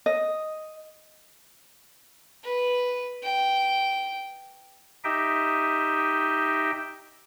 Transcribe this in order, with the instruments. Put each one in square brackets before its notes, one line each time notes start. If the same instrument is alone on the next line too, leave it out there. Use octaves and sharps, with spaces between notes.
[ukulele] D#5
[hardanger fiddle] B4
G5
[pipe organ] D#4 G4 D#5 E5 G5